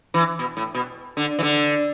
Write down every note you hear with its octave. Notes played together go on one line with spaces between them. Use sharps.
E3
B2
A2
B2
D3
E3
D3